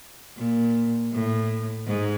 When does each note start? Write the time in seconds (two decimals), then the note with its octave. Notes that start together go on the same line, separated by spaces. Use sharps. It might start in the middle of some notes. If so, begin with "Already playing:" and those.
0.37 A#2
1.13 A2
1.87 G#2